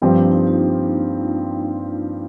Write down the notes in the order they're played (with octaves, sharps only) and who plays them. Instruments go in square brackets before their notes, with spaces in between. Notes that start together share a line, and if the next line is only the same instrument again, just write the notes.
[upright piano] G2 F3 C4 G4 C5 [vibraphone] A#3
[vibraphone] D4
D#4
F4